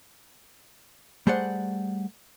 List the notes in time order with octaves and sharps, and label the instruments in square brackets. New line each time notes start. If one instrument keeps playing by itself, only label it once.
[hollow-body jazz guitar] G3 A3 G#4 C5 D5 F#5